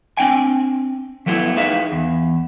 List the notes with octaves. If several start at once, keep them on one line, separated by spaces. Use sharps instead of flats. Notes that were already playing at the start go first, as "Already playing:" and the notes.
C4 D4 G5 G#5
F3 F#3 A3 B3 E4
D#4 G#4 B4 E5 F5
E2